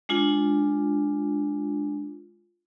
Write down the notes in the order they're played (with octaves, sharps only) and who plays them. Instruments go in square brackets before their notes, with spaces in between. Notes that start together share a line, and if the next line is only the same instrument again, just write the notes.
[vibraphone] G#3 D4 F4